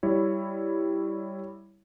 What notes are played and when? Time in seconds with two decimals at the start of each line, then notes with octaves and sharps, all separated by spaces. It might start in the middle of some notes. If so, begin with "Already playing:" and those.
0.03 G3 E4 C#5